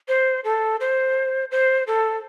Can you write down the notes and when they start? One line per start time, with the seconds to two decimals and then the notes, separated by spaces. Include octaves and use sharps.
0.08 C5
0.44 A4
0.80 C5
1.51 C5
1.87 A4